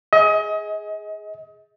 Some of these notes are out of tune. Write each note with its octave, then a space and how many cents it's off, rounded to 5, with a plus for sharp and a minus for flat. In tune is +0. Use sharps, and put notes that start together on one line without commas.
G#4 +0 D#5 +35